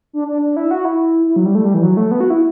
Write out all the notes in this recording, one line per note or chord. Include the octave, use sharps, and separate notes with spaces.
D4
D4
D4
E4
F#4
E4
E4
F#3
G3
A3
G3
E3
F#3
A3
B3
F#4
E4